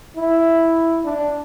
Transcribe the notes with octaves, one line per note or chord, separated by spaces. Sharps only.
E4
D4